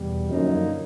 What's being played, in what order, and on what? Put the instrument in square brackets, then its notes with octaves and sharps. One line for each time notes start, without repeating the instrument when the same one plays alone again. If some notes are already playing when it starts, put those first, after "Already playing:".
Already playing: [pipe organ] E2 B2 G3
[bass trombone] F#2 [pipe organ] D3 F3 A#3 D#4